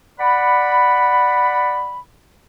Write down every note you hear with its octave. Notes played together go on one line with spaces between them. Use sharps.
D5 F#5 B5